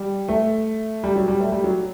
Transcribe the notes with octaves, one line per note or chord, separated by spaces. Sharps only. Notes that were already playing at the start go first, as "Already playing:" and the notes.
Already playing: G3
A3
G3
F#3
G3
A3
G3
F#3